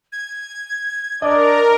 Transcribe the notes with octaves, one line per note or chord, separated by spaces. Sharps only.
G#6
D4 A#4 D5 D#5